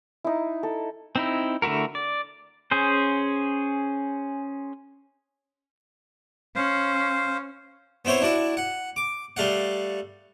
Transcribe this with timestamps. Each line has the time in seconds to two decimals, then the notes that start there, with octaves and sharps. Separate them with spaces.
0.24 D#4 E4
0.63 A4
1.16 C4 D#4 E4
1.62 D3 A3 E4 F#4 A#4
1.95 D5
2.71 C#4 G#4 C5
6.56 C#4 C5 F5
8.05 B3 C4 E4 C5 C#5
8.22 D4 E4 F#4
8.57 F#5
8.96 D6
9.37 G3 A3 F5 F#5